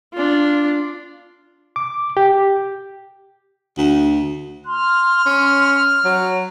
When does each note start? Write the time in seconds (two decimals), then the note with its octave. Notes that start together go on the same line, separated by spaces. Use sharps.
0.14 D4 F4
1.76 D6
2.17 G4
3.78 D2
4.66 C6 F6
5.26 C#4
6.05 F#3